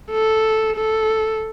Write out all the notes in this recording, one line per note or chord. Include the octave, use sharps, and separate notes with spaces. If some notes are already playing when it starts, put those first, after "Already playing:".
A4
A4